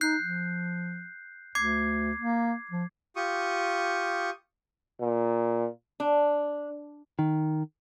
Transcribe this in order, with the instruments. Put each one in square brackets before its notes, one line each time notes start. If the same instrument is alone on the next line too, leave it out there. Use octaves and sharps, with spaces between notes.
[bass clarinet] D#4 [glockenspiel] F#6 G6 C7
[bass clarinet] F3
[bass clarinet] D2 [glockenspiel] D6 G#6 C7
[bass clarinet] A#3
F3
[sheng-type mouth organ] F4 G4 C#6 D#6
[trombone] A#2
[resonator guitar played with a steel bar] D4
[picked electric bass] D#3